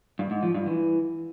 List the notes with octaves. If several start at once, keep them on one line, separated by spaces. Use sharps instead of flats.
G2
G#2
F3
G2
E3